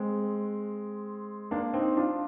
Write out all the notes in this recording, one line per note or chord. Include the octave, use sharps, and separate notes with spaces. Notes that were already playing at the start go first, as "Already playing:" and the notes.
Already playing: G#3 C4
A#3 D4
C4 D#4
D4 F4